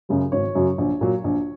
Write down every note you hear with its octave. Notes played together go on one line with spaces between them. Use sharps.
F#2 C#3 F#3
G#1 C#5
F#2 C#3 F#3
A#1
A#2 F#3
A#1